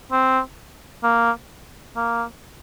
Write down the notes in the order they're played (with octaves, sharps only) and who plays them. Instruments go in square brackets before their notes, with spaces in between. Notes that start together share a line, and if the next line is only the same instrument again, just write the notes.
[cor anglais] C4
A#3
A#3